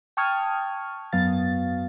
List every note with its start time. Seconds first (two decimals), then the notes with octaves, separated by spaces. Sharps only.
0.17 G5 A5 C#6 D#6 F6 G#6
1.12 G#1 F#2 F#3 B3 F5 A6